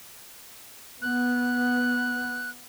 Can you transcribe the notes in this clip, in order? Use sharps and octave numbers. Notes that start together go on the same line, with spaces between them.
B3 F#6